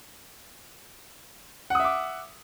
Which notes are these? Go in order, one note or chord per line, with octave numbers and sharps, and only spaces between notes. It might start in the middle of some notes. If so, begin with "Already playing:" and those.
E5 F#5 D6 D#6